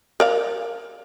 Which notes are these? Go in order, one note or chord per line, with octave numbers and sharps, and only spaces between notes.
A#4 D5 F5